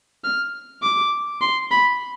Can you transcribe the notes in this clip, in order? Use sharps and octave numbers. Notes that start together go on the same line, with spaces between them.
F6
D6
C6
B5